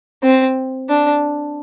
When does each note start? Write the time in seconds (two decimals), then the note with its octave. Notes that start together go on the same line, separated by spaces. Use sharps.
0.23 C4
0.89 D4